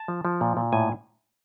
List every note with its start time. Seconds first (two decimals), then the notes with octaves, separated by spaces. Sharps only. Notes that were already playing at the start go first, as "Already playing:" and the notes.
Already playing: A5
0.08 F3
0.25 F3
0.41 A#2
0.57 A#2
0.73 A2 G#5